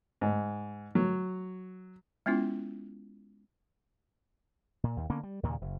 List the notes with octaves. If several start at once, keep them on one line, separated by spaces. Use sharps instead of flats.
G#2
F#3
G#3 B3 C#4 E4 F4
A#2
D#2
D3 A#3 B3 C#4
G3
D#2 A#2 C#3 A#3
F#1